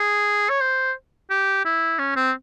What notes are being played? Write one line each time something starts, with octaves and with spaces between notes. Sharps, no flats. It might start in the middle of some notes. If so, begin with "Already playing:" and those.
Already playing: G#4
C#5
C5
G4
E4
C#4
C4